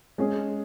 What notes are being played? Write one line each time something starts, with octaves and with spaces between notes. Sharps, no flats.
G#3 C#4 G#4